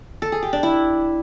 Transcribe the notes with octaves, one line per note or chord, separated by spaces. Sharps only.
A4
G#4
G4
D4
E4